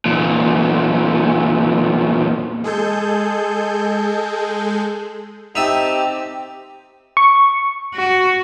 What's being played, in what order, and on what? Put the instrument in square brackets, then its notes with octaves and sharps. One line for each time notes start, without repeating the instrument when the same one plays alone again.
[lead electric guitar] E2 A#2
[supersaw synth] G#3 G#4 A4 G6
[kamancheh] C4 G4 [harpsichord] D#4 E5 A5
[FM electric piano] C#6
[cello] F#4